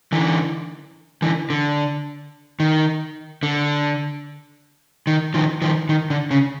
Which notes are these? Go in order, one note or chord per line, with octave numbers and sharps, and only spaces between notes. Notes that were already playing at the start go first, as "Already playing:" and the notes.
D3 E3
D3 E3
D3
D#3
D3
D#3
D#3 F3
D#3 F3
D#3
D3
C#3